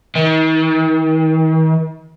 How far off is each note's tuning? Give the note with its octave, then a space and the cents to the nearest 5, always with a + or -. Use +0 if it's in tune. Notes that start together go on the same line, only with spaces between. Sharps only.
D#3 +40